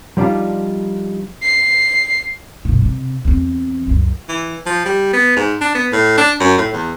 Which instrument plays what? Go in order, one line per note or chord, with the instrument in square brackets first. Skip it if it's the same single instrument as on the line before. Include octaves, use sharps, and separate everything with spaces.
[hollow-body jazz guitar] F3 G3 D4 D#4 F4
[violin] C7
[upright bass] G2 B2
C3
E2 C4
C#2 F#2
[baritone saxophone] E3
F3
G3
B3
G#2
D4
B3
A2
D4
F#2
A2
E2